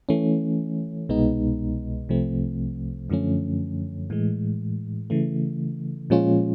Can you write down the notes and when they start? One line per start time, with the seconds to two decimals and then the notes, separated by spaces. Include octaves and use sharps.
0.09 E3 A3 C#4
1.09 C2 B2 G#3 B3 D#4
2.09 C2 C3 F3 A3 C4
3.10 F#2 D3 F3 A3 C#4
4.10 A2 E3 G#3
5.10 C#3 E3 A3
6.10 A#2 F3 G#3 C#4 F4